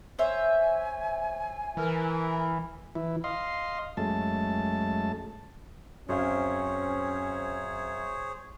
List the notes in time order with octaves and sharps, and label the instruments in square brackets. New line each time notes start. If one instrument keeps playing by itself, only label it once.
[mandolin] C5 C#5 E5 [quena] G#5
[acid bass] E3 [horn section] E4 A#4
[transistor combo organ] E3 E4
D#5 F5 C6
F#2 G#3 A3 A5
[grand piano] F#2 C4 F5 [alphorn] C#4 [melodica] G#4 C5 C#5